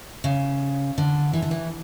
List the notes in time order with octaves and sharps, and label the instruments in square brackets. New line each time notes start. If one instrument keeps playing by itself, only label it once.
[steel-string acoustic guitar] C#3
D3
E3
D3
E3